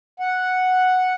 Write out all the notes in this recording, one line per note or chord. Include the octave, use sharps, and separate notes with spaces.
F#5